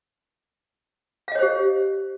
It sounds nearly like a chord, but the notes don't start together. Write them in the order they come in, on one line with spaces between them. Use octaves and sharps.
F5 D#5 C#5 C5 G4